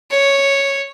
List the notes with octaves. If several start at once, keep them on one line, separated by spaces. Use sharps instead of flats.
C#5